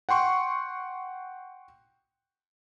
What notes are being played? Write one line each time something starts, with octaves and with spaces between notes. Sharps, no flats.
F#5 G5 C6 C#6